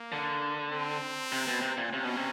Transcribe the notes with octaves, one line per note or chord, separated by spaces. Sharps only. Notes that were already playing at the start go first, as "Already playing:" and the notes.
Already playing: A#3
D3
C4
C3
B2
C3
A#2
C3 C#4
B2
C3